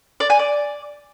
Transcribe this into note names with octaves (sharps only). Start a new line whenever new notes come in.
D5
G#5
D5